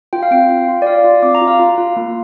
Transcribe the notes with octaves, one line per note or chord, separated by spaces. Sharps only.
F4 G5
F5
C4 G5
F4
F4
D5
F4 F5
F4
C4 D6
A#5
F4
F5
F4
F4
A#3